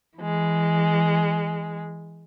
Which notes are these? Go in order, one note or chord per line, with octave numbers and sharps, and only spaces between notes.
E3 G#3